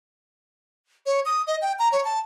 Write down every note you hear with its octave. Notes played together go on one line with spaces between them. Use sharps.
C#5
D#6
D#5
G5
A#5
C#5
A5